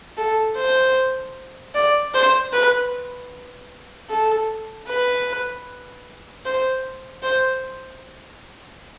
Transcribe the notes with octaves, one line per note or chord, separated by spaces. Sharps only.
A4
C5
D5
C5
B4
A4
B4
C5
C5